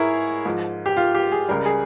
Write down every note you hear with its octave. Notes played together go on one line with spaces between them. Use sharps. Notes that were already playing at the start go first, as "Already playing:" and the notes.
Already playing: G#2 E4 G#4 A#4 C#5
G#2 F3
G4
F4
G4
G#4
C#2 C#3 G3 A#4
G#4